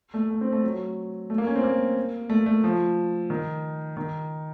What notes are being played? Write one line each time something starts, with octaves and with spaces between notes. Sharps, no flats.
A3
A3
C4
A3
F#3
A3
A#3
C#4
C4
A#3
A3
A3
F3
D#3
D#3